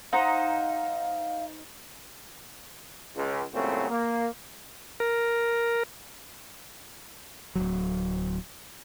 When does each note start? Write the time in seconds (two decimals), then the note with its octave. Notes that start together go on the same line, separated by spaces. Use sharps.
0.13 D#4 C5 F5 F#5 A#5
3.16 C#2
3.53 C2 A#2 C#3 F#3 A3 C4
3.89 A#3
5.00 A#4
7.55 D1 A#1 F#3